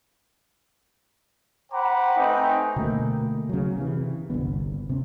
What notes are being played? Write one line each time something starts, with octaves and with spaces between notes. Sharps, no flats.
C5 F#5 G5 A#5 B5 D6
A3 C4 D#4 B4 G5 G#5
B2 D3 A3 A#3
C#3 F#3
C3 E3
G1 C2 D3 B3
C3 C#4